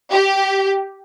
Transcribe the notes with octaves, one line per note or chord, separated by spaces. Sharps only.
G4